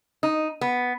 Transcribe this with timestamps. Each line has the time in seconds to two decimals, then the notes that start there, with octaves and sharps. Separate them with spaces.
0.23 D#4
0.61 B3